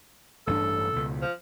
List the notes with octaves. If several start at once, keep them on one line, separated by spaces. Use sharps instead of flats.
A1 G2 D4 A4
C#2 B2
F3